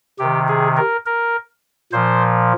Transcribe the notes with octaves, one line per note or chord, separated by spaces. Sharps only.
C3 D#3 G4
G#4
A#4
A#4
A#2 F3 C5